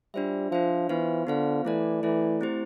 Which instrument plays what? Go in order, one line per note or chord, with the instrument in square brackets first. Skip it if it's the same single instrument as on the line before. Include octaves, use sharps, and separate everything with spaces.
[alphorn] G3 [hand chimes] D4 F4 C5 E5
[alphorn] F3 [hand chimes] D4 F4 C5 E5
[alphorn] E3 [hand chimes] B3 F4 C5 F5
[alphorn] D3 [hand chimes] B3 F4 C5 F5
[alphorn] E3 [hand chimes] A3 E4 A4 D5
[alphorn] E3 [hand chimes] A3 E4 A4 D5
[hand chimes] A3 C4 E4 G4 C5